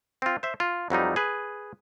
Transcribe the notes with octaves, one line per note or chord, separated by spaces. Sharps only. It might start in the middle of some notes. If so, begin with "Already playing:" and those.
C4 F4
C5 E5
F4
F2 F#3 G3 D#4
G#4 B4